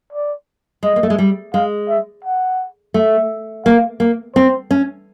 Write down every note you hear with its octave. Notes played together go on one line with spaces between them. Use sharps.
D5
G#3 D#5
A#3
A3
G#3
G3
G#3 F5
E5
F#5
A3
A#3 F5
A#3
C4 C5
C#4